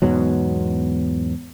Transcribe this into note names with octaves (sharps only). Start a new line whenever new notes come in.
E2 G#2 B2 F#3